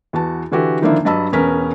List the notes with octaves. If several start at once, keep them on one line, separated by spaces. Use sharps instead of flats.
E2 F#4 A5
D3 E3 F#4 G4 A4
D3 D#3 F3 A#3 D4 E4
G2 F#3 D#5 A5 B5 E6
E1 B3 C#4 A#4 B6